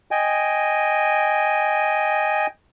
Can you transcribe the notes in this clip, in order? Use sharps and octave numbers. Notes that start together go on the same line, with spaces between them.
D#5 G5 G#5